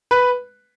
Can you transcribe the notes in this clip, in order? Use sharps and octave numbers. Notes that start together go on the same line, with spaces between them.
B4